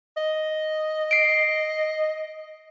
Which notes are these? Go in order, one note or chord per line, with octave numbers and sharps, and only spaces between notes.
D#5
C7 D7